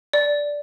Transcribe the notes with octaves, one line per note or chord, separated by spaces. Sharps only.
D5